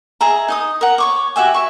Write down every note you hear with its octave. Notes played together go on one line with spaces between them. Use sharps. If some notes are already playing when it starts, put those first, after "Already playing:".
G#4 D#5 E5 A#5
D#4 D#5 D#6
A#4 F#5
C#5 C#6 D6
F#4 G4 E5 G#5
E5 C#6